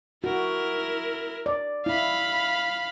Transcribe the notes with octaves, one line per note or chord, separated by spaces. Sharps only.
E4 F#4 A#4
D5
E4 F5 B5